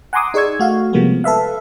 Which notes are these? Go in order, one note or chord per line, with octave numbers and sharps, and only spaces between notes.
F#5 G#5 A#5 C6 D6 D#6
D#4 G#4 D5 C#6 E6 G#6
A3 F#4 F5
C3 F3 G3 G#3 A#3 B3
A4 B4 E5 F5